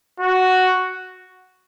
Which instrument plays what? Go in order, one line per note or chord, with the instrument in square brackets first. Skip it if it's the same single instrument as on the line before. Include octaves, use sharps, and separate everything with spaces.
[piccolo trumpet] F#4